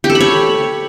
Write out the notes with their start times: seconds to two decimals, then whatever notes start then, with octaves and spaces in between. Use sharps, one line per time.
0.04 G4
0.10 A4
0.15 B5
0.20 C#5